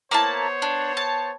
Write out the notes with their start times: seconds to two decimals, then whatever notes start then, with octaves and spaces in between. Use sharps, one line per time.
0.11 A#3 B3 E4 C5 C#5 A5
0.62 D4
0.97 A5